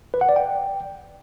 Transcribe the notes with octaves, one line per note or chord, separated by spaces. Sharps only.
B4
F#5
D5
G5